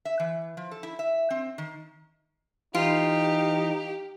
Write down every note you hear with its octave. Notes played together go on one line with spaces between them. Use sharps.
E5
E3
F3
A4
E4
E5
C4
D#3
E3 D#4 F4 G4